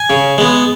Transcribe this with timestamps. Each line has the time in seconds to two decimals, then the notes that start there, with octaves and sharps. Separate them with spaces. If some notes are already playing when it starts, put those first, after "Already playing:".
Already playing: G#5
0.10 C#3
0.38 G#3 B3